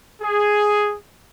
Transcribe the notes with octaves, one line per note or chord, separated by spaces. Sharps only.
G#4